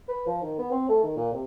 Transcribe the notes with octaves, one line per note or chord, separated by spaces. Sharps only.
B4
F3
D#3
B3
C4
A3
D#3
A#2
C3